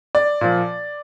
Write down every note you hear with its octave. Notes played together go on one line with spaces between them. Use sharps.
D5
A#2 F3